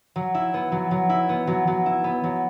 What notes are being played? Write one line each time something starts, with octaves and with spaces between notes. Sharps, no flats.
F#3
E4
B3
F#3
F#3
E4
B3
F#3
F#3
E4
B3
F#3